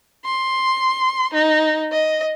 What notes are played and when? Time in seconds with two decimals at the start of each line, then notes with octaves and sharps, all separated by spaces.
0.25 C6
1.34 D#4
1.92 D#5